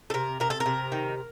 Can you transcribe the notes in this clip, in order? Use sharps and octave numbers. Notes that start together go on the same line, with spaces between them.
A4
C3 A#4
C3 A#4
A4
A#4
C3
D#3